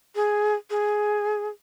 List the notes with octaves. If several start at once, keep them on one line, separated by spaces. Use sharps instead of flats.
G#4
G#4